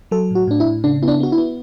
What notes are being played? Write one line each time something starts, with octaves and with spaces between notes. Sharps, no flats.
F#3 A4
A2 F#4
A2 D4
E4
A2
C#3 D4
B3 E4
D4
B3 F#4
E4
B3